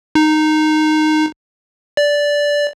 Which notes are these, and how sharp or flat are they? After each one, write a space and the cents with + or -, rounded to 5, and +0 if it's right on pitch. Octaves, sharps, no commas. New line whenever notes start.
D#4 -10
D5 -10